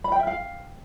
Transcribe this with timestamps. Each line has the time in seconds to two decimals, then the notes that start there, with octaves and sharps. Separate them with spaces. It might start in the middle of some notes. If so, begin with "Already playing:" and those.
0.04 B5
0.12 G5
0.19 E5
0.27 F5